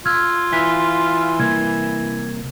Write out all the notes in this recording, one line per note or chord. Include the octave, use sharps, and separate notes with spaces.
F4 E6 F6 G#6
E3 B6
C2 A#3 G#6